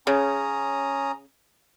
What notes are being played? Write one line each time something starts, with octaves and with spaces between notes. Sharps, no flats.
C#3 C#4 A#5 D#6